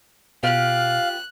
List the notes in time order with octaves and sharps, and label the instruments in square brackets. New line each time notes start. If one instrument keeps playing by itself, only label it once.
[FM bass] B2 [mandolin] F4 G4 G5 [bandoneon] F5 [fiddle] F#6